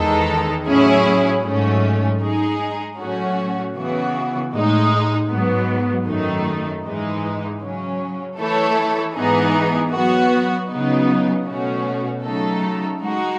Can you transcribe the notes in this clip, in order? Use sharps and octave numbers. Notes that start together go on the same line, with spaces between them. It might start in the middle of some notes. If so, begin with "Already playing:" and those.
Already playing: E2 D#3 G#3 D#4 A4
A2 F#3 C#4 E4 G#4
G#2 F#3 A3 C#4
G#3 D#4 G#4
A2 F#3 A3 C#4 F#4
C#3 E3 B3 F#4
A2 G#3 D#4
G#2 F#3 B3
F#2 D#3 A3 D#4
G#2 E3 G#3 D#4
C#3 F#3 C#4
E3 A3 E4 A4 C#5
G#2 E3 B3 D#4 G#4
F#3 B3 F#4
C#3 F#3 B3 D#4
B2 A3 C#4 F#4
C#3 F#3 A3 D#4 A4
G#3 D#4 F#4